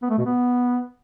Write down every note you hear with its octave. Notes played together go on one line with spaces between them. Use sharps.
B3
A3
B2
B3